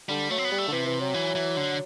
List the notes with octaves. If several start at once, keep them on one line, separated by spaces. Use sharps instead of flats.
D3 G3
F#3 A3
C4
B3
G3
A3
D3
C3 E3
E3
F#3
E3
E3
D3